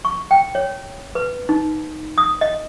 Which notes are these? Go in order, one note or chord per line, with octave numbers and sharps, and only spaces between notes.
C#6
G5
C#5
B4
D#4
D#6
D#5